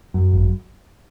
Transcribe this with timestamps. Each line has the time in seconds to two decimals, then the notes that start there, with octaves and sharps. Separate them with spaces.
0.14 F#2
0.32 G#1